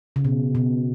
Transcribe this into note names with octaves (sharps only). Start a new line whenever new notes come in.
C#3
B2
B2